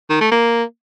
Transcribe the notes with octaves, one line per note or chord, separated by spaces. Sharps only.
D#3
A3
A#3